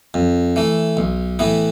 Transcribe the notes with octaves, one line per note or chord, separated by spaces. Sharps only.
F2
E3 A3
B1
A2 E3 B3